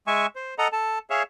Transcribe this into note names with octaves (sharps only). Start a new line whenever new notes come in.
G#3 E5 G#5 C#6
C5
A4 D#5 F#5 A#5
A4 A5
G#4 C#5 E5 F5